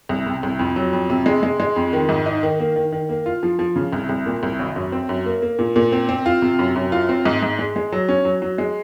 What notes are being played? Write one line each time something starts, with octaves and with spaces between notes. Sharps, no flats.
C2
C3
C2
F2
F#3
F2
C3
G#3
G#3
G#3
F2
D#3
G#2
D#4
D#3
A#3
D#3
D#3
A#3
F4
F3
F3
C#3
C2
C2
A#2
C2
G#1
F#2
C4
F#2
A#3
A#3
A#2
A#2
C4
C4
F4
C3
F#2
F#2
F4
C4
G#2
G#2
G#3
G#3
F#3
C#4
F#3
F#3
G#3